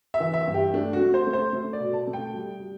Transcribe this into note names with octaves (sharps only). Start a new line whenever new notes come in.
E5
E3
E5
G2
G4
A3 D4
F#4
A3
C5
A3
C5
A3
D5
B2
A5
A3
G5
G3
G3